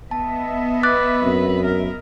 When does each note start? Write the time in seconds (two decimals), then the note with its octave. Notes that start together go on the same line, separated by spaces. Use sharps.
0.11 B3 D#5 E5 A5
0.83 B4 D6 F#6 A6
1.23 F#2 C4
1.65 A#4